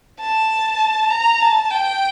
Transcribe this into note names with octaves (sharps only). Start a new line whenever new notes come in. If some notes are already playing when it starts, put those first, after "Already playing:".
A5
A#5
A5
G5